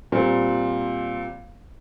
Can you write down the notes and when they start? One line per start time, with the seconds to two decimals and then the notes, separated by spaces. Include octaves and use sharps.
0.12 A#2 G3 C4